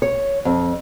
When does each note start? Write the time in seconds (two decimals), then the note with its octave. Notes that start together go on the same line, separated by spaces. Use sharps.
0.02 C#5
0.45 F2